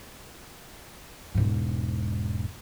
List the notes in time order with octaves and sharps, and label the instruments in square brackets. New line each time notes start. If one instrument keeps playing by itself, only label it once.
[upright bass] E1 G#2